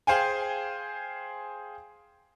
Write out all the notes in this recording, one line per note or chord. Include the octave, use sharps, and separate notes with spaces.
G#4 C5 F5 G5 G#5